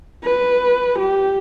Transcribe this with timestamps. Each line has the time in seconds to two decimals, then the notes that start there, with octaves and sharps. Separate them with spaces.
0.24 B4
0.99 G4